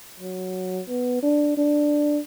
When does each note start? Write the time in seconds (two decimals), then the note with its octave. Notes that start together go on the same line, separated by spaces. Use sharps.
0.20 F#3
0.88 B3
1.23 D4
1.57 D4